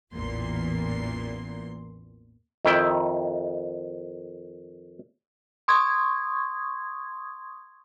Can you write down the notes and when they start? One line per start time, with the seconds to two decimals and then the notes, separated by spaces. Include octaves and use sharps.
0.13 A1 E2 A#2 C6
2.65 F2 D#3 E4 G5
5.68 C6 C#6 D#6 G#6